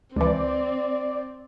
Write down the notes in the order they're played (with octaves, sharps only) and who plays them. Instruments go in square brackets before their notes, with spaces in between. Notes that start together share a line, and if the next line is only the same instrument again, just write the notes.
[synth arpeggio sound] C#2 E3 [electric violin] C4 [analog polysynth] D5